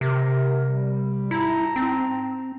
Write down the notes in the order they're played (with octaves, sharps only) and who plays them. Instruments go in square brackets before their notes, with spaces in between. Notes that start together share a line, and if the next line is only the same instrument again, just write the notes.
[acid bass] C3 [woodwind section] A#4
[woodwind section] G3
[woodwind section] G#2 A5 A#5 [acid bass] E4
[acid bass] C4